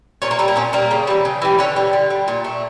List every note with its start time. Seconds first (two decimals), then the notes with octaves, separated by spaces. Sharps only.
0.22 A#2 C#4
0.31 A#3
0.39 G3 A3
0.48 A#3
0.56 A#2 C#4
0.73 G3 A#3
0.91 C#3
1.07 E3 G3
1.25 C#3
1.42 E3 G3
1.59 D3 C#4
1.76 G3
1.93 D3
2.10 G3
2.28 A#2
2.44 A3